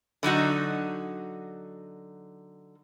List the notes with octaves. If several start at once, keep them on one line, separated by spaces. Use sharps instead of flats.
D3 F#3 D#4 F#4